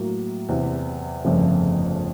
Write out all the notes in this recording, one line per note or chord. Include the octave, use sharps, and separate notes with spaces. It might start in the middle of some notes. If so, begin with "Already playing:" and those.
Already playing: A2 F#3 A#3
E2 C3 E3
G1 F2 C#3 F3 A3